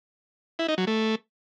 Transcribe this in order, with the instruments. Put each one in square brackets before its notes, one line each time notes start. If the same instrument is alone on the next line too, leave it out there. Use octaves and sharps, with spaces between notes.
[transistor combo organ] E4
D#4
F#3
A3